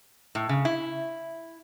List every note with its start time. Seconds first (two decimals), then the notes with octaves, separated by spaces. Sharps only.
0.35 A2
0.49 C#3
0.65 E4